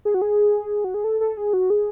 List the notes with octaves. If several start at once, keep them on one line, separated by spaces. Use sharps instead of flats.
G#4
F#4
G#4
F#4
G#4
A4
A4
G#4
F#4
G#4